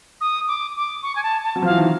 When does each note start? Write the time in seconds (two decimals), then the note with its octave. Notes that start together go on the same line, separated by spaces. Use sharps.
0.20 D#6
0.47 D6
0.76 D6
1.02 C#6
1.15 G#5
1.23 A5
1.44 A5
1.56 F#3
1.62 F3 F5
1.70 E3
1.78 D#3